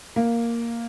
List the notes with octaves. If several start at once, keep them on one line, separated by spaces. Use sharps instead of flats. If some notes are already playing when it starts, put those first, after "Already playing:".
A#3